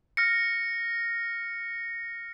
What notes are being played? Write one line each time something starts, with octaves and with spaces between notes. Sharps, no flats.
F6 A#6 C#7